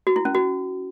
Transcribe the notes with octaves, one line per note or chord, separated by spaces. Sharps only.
F#4
E4
C#4
F#4